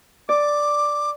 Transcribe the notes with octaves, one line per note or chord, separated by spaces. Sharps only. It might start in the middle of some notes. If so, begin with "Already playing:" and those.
D5 D6